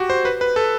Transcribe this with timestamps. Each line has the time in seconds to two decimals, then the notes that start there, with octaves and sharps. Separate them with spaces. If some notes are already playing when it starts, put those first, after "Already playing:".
Already playing: F#4 G4
0.10 C5
0.25 B4
0.41 B4
0.56 A4